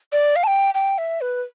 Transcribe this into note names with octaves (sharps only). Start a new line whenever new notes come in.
D5
F5
A5
G5
G5
E5
B4